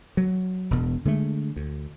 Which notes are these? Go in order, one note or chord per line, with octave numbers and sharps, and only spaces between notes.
F#3
E1 B2
D3 G#3 A3
D2